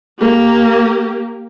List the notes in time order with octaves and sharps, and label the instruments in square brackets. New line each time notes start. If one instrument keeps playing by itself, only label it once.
[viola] A#3 G4